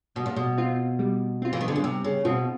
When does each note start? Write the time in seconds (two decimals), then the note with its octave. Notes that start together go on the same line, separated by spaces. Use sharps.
0.16 B2 G3
0.26 A#2
0.36 B2
0.58 C4 F4
0.99 G3
1.42 C4 F4
1.53 E3
1.61 D#3
1.68 D3
1.76 C#3
1.83 C3 G3
2.04 C#3
2.25 B2 C4 F4